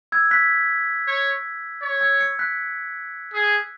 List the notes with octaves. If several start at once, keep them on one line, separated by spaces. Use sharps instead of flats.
E6 G#6
F#6 B6
C#5
C#5
E6 G#6
G#6 C#7
F#6 B6
G#4